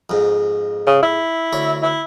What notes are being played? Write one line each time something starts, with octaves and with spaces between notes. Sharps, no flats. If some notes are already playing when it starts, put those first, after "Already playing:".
F2 G#2
C#3
E4
D2 C#5
E4